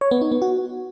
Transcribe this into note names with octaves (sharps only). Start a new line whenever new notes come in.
C#5
B3
D#4
B3
F#4